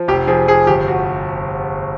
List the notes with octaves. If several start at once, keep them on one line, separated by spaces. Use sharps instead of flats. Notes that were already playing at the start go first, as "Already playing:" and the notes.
Already playing: F3
F1 G4
F3 G#4
F3 G#4
G1 G4
F#4